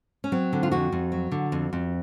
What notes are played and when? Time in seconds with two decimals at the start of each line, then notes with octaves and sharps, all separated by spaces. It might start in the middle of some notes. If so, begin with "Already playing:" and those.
0.24 C#4
0.32 F#3 C4
0.53 D3
0.63 F4
0.72 F2 F#4
0.92 F2
1.12 F#3
1.32 D3
1.52 F2
1.73 F2